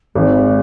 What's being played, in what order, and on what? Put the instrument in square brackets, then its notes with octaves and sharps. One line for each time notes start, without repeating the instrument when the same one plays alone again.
[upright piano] G#1 [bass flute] G#3